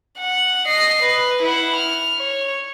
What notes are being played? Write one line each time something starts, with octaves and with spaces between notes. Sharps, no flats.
F#5
D#5 C7
B4
E4 F#5
F6
C#5